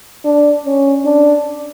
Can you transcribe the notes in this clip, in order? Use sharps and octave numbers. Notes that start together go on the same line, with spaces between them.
D4
C#4
D4